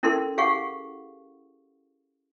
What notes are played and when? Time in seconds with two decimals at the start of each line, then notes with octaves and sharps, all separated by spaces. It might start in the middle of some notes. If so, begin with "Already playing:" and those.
0.03 C#4 E4 A4 A#4 C6
0.38 G4 G#4 F5 F#5 C#6